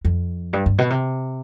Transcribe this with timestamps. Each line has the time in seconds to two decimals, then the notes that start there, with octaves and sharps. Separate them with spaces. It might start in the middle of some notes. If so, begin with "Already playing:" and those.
0.05 F2
0.53 G2
0.66 G2
0.78 B2
0.90 C3